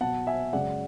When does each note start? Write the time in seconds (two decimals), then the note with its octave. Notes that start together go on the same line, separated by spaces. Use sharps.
0.01 B2 F#3 F#5 A5
0.27 E5 G#5
0.53 F#2 C#3 G#3 D5 F#5